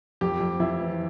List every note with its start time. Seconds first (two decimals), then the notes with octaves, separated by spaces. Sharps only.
0.21 F2 G4
0.40 F2
0.60 F2 E4
0.80 E3